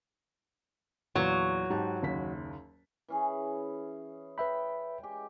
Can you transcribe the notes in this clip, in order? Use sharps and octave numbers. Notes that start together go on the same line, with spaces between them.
E2 A#2 F#3
G#2 G4 A5
F#1 D#2 B6
E3 C#4 G#4
B4 E5 G5 B5
G#3 G4